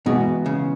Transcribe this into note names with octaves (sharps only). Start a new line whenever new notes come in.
B2 E3 G#3 B3 D#4
C#3